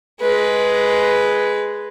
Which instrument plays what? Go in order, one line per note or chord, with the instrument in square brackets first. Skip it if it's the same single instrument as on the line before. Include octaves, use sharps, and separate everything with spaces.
[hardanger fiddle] G#3 B4